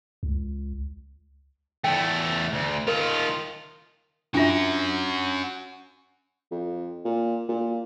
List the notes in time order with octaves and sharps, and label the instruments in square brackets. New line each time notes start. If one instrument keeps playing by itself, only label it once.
[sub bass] C#2
[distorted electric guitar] E2 A3 [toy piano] G5
[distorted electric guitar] D2
[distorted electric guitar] D#3 F4 [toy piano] A#4
[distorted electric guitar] C#4 F#4 [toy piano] D4 F4 E5
[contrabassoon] F2
A#2
A#2